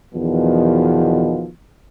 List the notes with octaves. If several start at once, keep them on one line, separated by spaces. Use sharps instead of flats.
E2 B2 D#3 F3